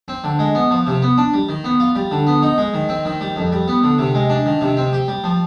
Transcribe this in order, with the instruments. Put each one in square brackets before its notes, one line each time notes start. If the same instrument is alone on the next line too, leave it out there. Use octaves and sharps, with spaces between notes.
[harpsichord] C4
D3
G#3
B3
F3
C3
B3
D4
G3
D#3
B3
F4
G3
D3
B3
D#4
G#3
D#3
C4
D#3
G3
F2
G3
B3
D3
C3
G#3
D4
D#3
C3
C4
G4
G3
F3